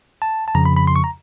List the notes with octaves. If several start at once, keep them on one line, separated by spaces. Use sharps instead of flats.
A5
A5
F2 C#3 F3 A#5
B5
B5
C6
C#6
A#5